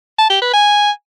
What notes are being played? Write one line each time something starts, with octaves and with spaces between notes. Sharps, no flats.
A5
G4
B4
G#5